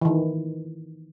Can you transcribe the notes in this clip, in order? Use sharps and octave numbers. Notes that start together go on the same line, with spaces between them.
D#3 E3